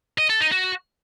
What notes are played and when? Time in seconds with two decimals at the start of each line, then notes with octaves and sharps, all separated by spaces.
0.18 D#5
0.29 A4
0.41 D#4
0.52 F#4